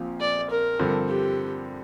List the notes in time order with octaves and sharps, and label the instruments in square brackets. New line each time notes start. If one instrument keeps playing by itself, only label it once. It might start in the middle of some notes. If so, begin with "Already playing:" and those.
Already playing: [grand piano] A#1 A#2 F3 C4 F4
[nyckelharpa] D5
A#4
[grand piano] G2 D3 F3 C4
[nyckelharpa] G4